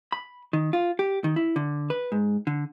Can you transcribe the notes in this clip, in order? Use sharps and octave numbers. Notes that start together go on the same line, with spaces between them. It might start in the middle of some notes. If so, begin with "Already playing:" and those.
B5
D#3
F4
G4
D#3
E4
D3
B4
G#2
D3